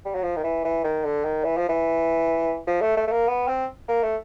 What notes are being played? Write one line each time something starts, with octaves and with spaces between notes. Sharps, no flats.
G3
F#3
F3
D#3
E3
E3
D#3
D3
D#3
E3
F3
E3
F3
A3
A3
A3
A#3
B3
C4
A#3
A3